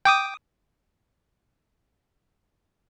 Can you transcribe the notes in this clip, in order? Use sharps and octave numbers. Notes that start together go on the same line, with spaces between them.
G5 D6 D#6